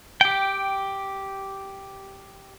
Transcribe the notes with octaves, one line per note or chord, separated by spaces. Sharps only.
G4 G5